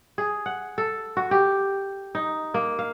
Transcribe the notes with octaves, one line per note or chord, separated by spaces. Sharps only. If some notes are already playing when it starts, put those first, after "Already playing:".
G#4
F#5
A4
F#4
G4
D#4
A#3
F5